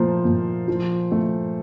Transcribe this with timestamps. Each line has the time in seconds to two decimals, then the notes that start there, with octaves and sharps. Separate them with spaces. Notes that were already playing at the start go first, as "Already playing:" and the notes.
Already playing: A#2 F3 A3 A#4 C5
0.25 A#2
0.68 F3
1.12 A3